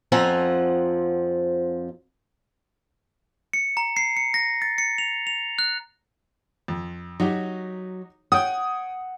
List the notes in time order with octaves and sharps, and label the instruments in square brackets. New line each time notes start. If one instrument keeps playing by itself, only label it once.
[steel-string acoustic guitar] F2 F3 C4 F#5 G#5 A#5
[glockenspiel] C#7
A#5
C7
C#7
A#6
A6
C#7
F7
F7
F#6
[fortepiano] F2
[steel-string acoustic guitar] F#3 [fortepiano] D#4 F#4 G4
[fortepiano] C#5 G5 [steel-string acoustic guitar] F#5 [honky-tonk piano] D#6